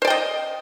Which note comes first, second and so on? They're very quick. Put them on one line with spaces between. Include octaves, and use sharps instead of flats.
C5 D5 G5 D#5